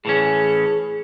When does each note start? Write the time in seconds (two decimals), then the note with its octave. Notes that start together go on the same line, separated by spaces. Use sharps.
0.05 A2 E3 C#4 G#4